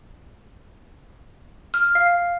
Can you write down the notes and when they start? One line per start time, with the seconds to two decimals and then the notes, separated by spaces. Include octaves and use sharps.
1.74 F6
1.95 F5